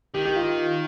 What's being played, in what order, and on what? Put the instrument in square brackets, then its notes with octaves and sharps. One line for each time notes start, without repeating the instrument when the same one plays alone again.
[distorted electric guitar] D#3 [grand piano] G4
[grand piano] G4
F4